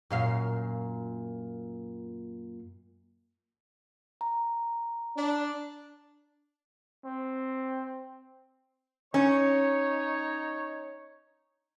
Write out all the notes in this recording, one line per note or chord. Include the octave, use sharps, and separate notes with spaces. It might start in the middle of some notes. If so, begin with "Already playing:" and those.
F#2 A#2 F5
A#5
D4
C4
C#4 D#4 C#5